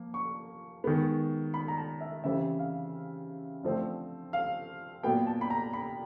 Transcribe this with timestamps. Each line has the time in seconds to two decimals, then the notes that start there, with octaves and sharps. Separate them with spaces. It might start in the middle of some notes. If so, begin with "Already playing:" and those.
Already playing: F3 A#3
0.14 C#6
0.84 D#3 G#3 B3
1.54 B5
1.68 A#5
1.78 A5
2.01 E5
2.24 C#3 E3 G3 C4 E5
2.59 F5
3.63 D3 F3 A3 C4
4.33 F5
5.03 A#2 F#3 B3 G5
5.27 A5
5.41 B5
5.50 A#5
5.73 B5